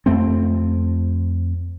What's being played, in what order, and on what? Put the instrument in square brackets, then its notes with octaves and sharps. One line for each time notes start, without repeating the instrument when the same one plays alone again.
[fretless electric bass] F2 A3 C4